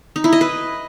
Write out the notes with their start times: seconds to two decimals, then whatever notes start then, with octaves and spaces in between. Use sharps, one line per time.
0.16 D#4
0.24 E4
0.32 D#5
0.41 B4